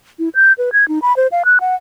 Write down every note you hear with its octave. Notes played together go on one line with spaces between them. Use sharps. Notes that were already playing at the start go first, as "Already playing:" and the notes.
E4
G6
B4
G#6
D#4
B5
C5
F5
F#6
F#5